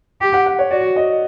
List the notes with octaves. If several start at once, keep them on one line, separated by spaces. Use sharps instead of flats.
G4
F#5
F#5
C#5
F#4 D5
D#5